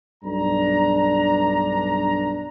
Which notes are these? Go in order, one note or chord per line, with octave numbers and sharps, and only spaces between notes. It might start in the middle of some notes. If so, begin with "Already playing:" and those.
B1 G2 D4 A#5